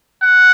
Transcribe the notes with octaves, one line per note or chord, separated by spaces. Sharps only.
F#5